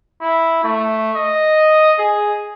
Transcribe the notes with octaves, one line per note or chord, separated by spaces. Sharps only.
E4
A3
D#5
G#4